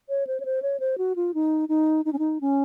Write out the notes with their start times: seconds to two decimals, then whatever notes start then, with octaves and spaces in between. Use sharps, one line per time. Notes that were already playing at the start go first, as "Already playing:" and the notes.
0.09 C#5
0.27 C5
0.40 C#5
0.45 C5
0.62 C#5
0.80 C5
0.98 F#4
1.16 F4
1.34 D#4
1.69 D#4
2.05 D#4
2.13 C#4
2.19 D#4
2.41 C#4